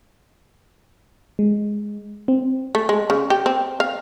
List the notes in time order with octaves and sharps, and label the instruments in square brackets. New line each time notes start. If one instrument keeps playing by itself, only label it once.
[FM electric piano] G#3
C4
[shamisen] A3
G#3
C#3
G4
C4
F5